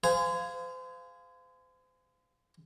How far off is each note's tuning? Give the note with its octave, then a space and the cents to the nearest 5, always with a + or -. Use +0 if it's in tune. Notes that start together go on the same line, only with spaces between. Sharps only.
G#4 +0 C5 -35 F5 +0